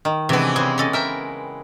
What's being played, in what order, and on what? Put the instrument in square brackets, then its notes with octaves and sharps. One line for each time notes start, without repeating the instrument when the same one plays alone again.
[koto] D#3
[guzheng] C3 D4 [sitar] E3 G#3 B3
[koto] C#3 C4 [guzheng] G#4
[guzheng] C#4 A4 D#5
[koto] A#4 E5 G5